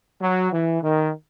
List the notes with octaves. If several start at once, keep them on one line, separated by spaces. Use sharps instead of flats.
F#3
E3
D#3